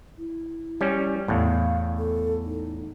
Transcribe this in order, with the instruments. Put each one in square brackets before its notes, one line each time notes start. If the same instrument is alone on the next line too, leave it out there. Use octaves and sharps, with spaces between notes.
[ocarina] E4
[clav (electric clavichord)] G3 C#4
[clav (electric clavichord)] E2 A2 [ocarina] F5
[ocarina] A4
D#4